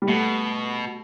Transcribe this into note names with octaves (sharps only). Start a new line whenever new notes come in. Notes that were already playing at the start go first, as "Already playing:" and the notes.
G3
B2 A3